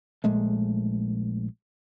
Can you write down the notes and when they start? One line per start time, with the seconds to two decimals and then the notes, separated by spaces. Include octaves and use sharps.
0.24 A#1 A#2 G#3 A3